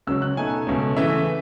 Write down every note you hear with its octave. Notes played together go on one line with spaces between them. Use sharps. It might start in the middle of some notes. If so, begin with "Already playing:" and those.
C#2 C#3 F#3 C#4 E6
F#6
B2 A3 D#4 G#5
C#2 B2 A3 C#4
C#3 E3 A3 E5